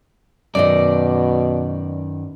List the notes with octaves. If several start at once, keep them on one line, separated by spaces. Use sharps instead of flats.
F#2 B2 D#3 D5 D#5